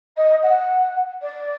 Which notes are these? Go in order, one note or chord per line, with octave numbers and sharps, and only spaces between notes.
D#5
F#5
D5